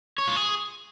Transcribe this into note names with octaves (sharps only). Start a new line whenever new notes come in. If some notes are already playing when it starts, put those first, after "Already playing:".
C#5
F4
G#4